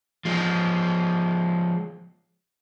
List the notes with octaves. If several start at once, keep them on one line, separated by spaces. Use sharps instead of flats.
F3 G#3